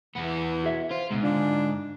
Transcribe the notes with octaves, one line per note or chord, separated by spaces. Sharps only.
E2 E3 B3
F#4 G#4 E5
F4 C5
C#2 G#2 B2
D3 D4 F4